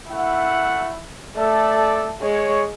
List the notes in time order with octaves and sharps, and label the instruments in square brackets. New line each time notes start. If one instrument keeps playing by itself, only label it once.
[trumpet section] A3 F#5 [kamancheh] E4
[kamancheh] A3 [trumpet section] A4 D5
[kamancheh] G#3 [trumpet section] C#5